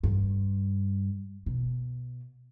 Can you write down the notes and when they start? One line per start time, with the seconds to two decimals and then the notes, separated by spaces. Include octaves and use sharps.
0.03 G2
1.46 B2